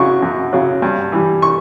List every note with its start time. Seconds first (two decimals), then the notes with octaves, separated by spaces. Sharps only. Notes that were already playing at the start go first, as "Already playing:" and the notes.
Already playing: F#2 C#3 F#3 C#6
0.22 F#2
0.53 C#3 F#3
0.82 G2
1.12 E3 G3
1.42 C#6